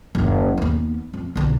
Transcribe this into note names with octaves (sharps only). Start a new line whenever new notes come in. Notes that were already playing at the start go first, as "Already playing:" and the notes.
F#1 D#2
D#2 B3
F2
B1 D3